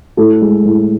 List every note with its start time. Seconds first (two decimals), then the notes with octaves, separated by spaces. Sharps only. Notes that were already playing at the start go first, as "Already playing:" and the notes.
0.17 A2 A4
0.41 G#3
0.65 A2